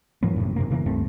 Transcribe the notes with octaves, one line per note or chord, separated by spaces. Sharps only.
G#2 E3 F#3 A#3
F#2 A2 C3
G#2 C3 A#3
C#3 E3 G#3 A#3
D1 G2 A3 C4